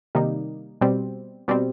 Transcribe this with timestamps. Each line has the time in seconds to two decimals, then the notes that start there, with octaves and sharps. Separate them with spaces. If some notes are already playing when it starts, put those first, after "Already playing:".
0.15 C3 D#3 G3 A#3 D#4
0.81 B2 G3 C4
1.48 B2 G3 C4